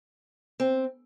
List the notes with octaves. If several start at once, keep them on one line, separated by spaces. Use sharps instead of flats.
C4